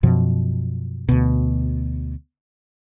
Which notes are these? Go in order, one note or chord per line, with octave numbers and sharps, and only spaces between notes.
F#2 B2 F3
D2 B2